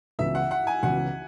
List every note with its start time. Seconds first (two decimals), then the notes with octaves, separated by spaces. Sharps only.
0.19 C#2 C#3 E3 B3 F#4 E5
0.35 F#5
0.51 F#5
0.67 G#5
0.83 C#2 C#3 E3 B3 F#4 F#5